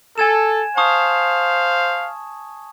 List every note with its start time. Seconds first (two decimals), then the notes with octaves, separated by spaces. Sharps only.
0.18 A4 G#5 G#6 E7
0.77 C5 F5 A5 C#6 D#6